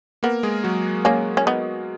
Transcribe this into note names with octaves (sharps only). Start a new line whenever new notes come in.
A#3 B3 A#4
G#3 G#4
F#3 F#4
A#3 C#4
C#4
B3 D#4